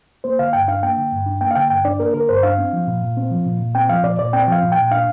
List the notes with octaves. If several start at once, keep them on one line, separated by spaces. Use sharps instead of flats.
A#3 C5
D3 F5
G2 G5
D4 F5
A#3 G5
D3
G2
D4
A#3 G5
F5
D3 G5
G2 G5
D4 D5
A#3 A#4
D3 A#4
G2 C5
D4 F5
C4
F3
A#2
A#2
C4
F3
A#2
A#2
C4 G5
F3 F5
A#2 D5
A#2 D5
C4 G5
F3 F5
A#2
G5
A#2
D4 F5